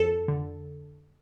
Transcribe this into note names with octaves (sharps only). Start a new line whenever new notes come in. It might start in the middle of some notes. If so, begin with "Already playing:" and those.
Already playing: F2 A4
D3